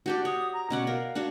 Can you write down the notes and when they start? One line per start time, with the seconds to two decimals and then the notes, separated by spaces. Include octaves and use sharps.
0.06 D4 F#4 G4 D5
0.25 C#5 D#6
0.53 A#5
0.70 B2 C#4 D5 F#5
0.87 A#4 F5
1.15 D4 F#4 C#5